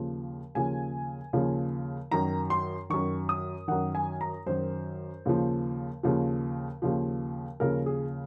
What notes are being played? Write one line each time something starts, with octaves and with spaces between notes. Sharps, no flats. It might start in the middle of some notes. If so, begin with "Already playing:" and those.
Already playing: D#2 C#3 F3
D#2 C#3 F3 G#5
D#2 C#3 F3
F#2 D#3 A#5
C6
F#2 D#3 C#6
D#6
F#2 D#3 F#5
G#5
A#5
F#2 D#3 C5
D#2 C#3 F3
D#2 C#3 F3
D#2 C#3 F3
D#2 C#3 F3 A#4
G#4